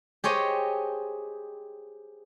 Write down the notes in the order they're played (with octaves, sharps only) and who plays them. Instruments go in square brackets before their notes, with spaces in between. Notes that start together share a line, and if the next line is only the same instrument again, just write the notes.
[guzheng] G4 G#4 C5 C#5 D#5